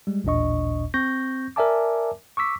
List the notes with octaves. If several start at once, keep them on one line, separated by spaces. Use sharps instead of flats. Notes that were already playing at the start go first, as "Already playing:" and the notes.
G3 G#3
A1 D#2 A#2 D4 D#5 C#6
C4 C#6 G6 A#6
A#4 D5 E5 G#5 A5 D6
C#6 D6 E6 B6